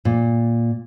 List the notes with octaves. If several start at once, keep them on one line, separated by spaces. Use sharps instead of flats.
A#2